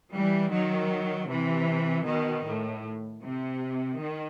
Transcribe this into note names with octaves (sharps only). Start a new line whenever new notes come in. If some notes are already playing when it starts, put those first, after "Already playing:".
E3 G3
D#3 F#3
C3 E3
B2 D#3
A2
C3
D#3